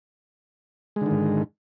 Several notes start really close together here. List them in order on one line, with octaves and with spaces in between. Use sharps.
G#3 D3 D#3 G#2